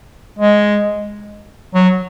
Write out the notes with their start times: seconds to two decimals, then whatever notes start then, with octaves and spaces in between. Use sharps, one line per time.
0.39 G#3
1.75 F#3